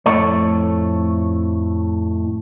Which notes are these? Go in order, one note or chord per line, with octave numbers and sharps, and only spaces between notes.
F2 A2 A3 A4 C#5